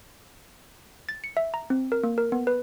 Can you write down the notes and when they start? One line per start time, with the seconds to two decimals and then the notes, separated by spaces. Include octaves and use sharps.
1.09 A6
1.24 C#7
1.37 E5
1.54 A#5
1.70 C4
1.92 A#4
2.03 A#3
2.18 A#4
2.32 B3
2.47 B4